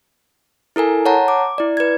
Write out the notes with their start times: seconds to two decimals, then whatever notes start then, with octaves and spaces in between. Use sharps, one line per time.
0.76 E4 A4 A#4 G#5
1.06 C#5 F#5 A5 A#5
1.28 D6
1.58 E4 D5
1.77 B4 G#6